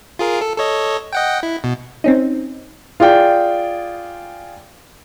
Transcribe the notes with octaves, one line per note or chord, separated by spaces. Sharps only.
F4 G#4 A#4
A4
A4 C#5 D#5
D#5 F#5 G5
E4
B2
C4 C#4 D#4
F4 G#4 D5 G5